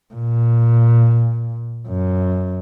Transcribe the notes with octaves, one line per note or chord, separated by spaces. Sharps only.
A#2
F#2